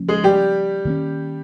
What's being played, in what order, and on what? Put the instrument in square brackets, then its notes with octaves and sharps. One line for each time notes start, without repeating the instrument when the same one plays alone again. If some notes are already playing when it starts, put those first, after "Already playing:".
Already playing: [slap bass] C#3 F3 A#3 C#4
[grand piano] G#3 G#4
G3 G4
[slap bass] D#3 A#3 C#4